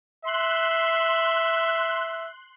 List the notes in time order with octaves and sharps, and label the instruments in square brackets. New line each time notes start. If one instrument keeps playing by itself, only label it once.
[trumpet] E5 [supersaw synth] C6 F#6